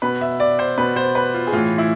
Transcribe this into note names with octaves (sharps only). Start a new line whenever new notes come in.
B2 B4
E5
D5
C5
B2 B4
C5
B4
F4
G#4
A2 E3 F4
E4